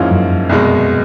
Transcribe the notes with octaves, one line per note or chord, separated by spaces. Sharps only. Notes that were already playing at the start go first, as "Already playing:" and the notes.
Already playing: F2 G#2 F3 A#3 C#4 E4
F#2
C2 B2 G#3